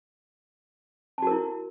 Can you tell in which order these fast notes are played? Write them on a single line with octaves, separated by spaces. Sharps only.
A5 F#4 A#4 E4